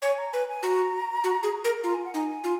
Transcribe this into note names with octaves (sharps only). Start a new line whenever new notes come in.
C#5 G#5
A#5
B4 G#5
G#5
F#4 A#5
F#4
G#4
A#4
F4 A#5
G#5
F#5
D#4 G#5
F4